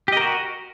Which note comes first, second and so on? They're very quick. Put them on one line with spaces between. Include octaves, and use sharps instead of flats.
G4 D#5 A#4 F#4